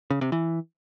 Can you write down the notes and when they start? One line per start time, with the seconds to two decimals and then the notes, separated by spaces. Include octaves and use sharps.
0.10 C#3
0.21 C3
0.32 E3